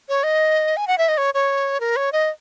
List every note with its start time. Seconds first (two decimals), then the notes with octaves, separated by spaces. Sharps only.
0.09 C#5
0.23 D#5
0.77 G#5
0.88 F#5
0.98 E5
1.08 D#5
1.18 C#5
1.34 C#5
1.80 A#4
1.96 C#5
2.12 D#5